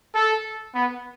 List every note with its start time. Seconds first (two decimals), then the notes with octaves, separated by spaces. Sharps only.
0.15 A4
0.75 B3